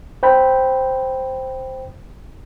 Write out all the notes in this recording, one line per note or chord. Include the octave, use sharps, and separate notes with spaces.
C5 G5 B5